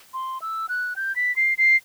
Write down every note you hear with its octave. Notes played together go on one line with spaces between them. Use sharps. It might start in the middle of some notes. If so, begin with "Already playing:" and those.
C6
E6
F#6
G6
B6
C7
C7